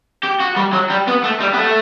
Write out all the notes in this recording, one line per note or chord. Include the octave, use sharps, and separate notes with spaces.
G4
F#4
G3
F#3
G3
B3
A3
G3
B3
A3